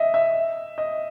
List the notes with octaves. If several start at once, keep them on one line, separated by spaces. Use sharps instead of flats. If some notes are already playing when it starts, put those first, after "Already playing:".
Already playing: D#5 E5
E5
D#5